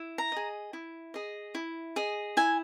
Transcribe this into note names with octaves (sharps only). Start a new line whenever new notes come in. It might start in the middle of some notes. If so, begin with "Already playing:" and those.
Already playing: E4
A#5
G#4 D#5
E4
G#4 D#5
E4
G#4 D#5
E4 G#5